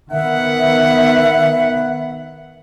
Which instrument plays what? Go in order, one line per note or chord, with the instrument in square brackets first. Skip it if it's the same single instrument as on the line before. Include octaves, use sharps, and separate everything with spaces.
[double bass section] D#3 B3 [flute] E5 [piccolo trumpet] F#5